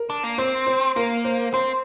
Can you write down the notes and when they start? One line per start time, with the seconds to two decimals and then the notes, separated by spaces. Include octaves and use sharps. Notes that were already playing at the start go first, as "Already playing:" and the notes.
Already playing: A#4
0.10 D4
0.23 A#3
0.38 C4 C5
0.67 C5
0.96 A#3 A#4
1.24 C5
1.54 C4 C5